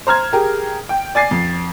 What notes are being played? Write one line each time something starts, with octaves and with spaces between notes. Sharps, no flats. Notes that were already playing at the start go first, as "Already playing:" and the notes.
C5 A#5 F6 G#6
G4 G#4 A#4
G5
D5 G#5 A6 C7
F2